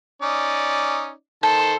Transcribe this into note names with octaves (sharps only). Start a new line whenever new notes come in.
C#4 D#4 D5
D#3 A4 C5 A5